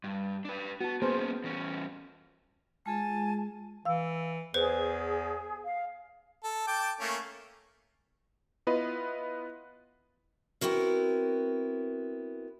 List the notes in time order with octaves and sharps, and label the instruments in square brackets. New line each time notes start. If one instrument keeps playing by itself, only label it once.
[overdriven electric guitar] G2
D4 B4
[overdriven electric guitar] B3 [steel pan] F#4 A5
[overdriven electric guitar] A#3 C#4 [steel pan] B3 G#4 C5
[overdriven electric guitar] E2 C#4
[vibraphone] G#3 F4 G#4 [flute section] G#5 A5
[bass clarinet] E3 [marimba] F5 E6
[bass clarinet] E2 [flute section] G#4 [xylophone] B4 C5
[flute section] F5
[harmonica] A4
G5 A5 D6
A3 A#3 C#4
[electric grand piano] B3 E4 F4 B4 D#5
[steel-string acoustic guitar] B3 C4 E4 F#4 A#4